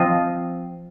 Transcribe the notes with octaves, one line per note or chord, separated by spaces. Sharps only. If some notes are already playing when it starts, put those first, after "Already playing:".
Already playing: F3 C4 F4 C5 D#5